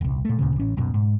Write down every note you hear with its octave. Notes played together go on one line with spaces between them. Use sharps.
D#1 C2
A#2 A3
D2 A#2 C#3
A1 C#4
D1 F#2 B2
G#2